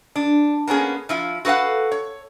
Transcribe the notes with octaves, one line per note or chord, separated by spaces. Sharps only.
D4
A#3 B3 C#4 G#4
F3 E4 F4
F#4 A4 B4 F5 F#5
C#5